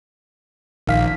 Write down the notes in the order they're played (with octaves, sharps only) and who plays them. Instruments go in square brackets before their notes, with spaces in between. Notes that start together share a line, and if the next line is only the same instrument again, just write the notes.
[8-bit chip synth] A#1 [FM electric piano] D#3 F5 B6